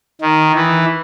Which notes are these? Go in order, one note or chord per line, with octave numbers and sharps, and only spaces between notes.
D#3
E3